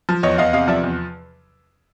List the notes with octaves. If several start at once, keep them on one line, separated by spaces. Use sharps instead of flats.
F3
E2 C#5 D#5
E2 D#5 F5
C3 D#5 F5
F3 D5 E5
E2